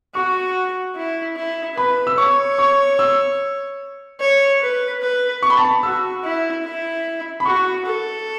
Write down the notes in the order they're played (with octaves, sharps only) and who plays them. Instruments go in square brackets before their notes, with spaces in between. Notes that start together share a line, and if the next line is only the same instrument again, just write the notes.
[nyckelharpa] F#4 [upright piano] C#6
[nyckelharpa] E4
E4
[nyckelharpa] B4 [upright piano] B5
[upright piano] E6
[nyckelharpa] C#5 [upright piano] C#6
[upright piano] C#6
E6
[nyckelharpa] C#5
B4
B4
[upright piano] C#6
B5
A5
B5
[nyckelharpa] F#4 [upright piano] E6
[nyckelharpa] E4
E4
[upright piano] B5
[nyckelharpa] F#4 [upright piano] C#6
[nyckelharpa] A4